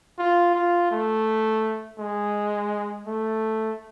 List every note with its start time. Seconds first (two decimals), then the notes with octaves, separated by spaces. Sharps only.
0.19 F4
0.55 F4
0.91 A3
1.98 G#3
3.06 A3